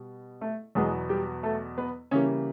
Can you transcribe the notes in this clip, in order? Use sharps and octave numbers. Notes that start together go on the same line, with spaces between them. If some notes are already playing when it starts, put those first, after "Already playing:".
Already playing: B2 G3
A3 A4
E2 B2 F#3 G#3 B3 G#4
G3 G4
A3 A4
B3 B4
C#3 E3 G3 A#3 C#4 C#5